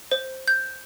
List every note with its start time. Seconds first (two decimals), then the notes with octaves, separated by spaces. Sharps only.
0.11 C5
0.48 G6